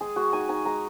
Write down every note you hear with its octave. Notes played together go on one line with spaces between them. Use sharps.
G#3 G#4
G#3 F#4
D#4 G#5
D#4 G#5
G#3 A#5